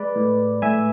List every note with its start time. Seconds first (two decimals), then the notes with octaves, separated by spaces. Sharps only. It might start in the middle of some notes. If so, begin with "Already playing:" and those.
Already playing: G#3 B4 D5
0.16 A2
0.62 A2 E5 G#5